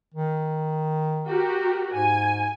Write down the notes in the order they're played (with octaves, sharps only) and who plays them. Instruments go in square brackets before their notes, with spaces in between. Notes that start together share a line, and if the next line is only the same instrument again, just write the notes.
[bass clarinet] D#3
[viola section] F#4 G4 A#4
[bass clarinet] G#2 [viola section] G#5